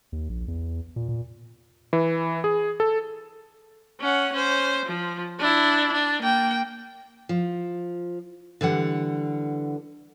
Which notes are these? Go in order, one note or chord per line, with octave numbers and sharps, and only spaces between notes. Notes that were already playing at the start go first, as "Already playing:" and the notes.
D#2
A#1
E2
A#2
A#2
E3
G#4
A4
C#4 F#5
C#4 C5
F3
D4 E4
D4
A#3 G5
F3
D3 E3 G3 F#5